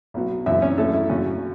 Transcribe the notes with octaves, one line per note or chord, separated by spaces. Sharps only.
B1 B2 F#3
F#2 C#3 E3 E4 E5
C#4 C#5
F#2 E3 A3 A4
E4
F#2 C#3 F#3 C#4